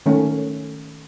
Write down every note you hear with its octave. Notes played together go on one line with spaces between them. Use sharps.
D#3 A3 C#4